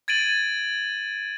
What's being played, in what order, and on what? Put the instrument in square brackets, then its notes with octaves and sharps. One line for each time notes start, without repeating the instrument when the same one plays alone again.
[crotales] G#6 A6 D7 D#7 F#7